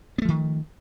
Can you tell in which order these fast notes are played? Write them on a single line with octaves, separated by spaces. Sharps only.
B3 A3 F3 D#3